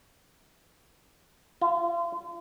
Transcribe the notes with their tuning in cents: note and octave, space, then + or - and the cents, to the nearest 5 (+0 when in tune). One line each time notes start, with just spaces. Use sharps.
F4 -40